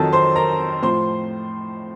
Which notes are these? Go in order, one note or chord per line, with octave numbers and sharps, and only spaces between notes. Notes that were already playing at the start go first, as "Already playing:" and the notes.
Already playing: F2 D#3 F#3 A4 A5
C5 C6
A#4 A#5
A2 F3 C5 C6